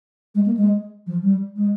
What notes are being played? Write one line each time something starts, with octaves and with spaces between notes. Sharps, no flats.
G#3
A#3
G#3
F3
G3
G#3